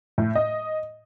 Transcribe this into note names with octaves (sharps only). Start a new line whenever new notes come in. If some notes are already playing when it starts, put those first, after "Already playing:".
A2
D#5